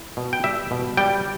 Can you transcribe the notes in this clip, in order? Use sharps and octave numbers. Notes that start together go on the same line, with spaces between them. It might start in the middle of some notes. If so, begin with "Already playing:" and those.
Already playing: E4
B2
G5
G3 E5
B2
G3 G5